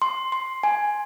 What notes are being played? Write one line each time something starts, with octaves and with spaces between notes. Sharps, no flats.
C6
C6
G#5